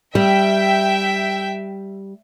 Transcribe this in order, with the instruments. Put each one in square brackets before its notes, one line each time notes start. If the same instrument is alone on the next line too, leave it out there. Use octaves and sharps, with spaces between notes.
[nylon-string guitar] G3 [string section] E5 G5